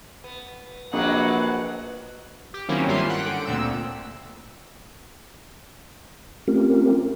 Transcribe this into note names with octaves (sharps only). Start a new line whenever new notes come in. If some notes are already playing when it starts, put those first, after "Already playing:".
B3
A#1 C3 F#3 A#3 F#4 B4 D#5 F#5
G4
D#3 F#3 A#3 C4 C#4 E4
G2 G3 C#4 F4 E5 C6
F#5 G5 F#6
D3 D7
D2 A#2 C4 E6
A3 C4 C#4 F4 G4 A#4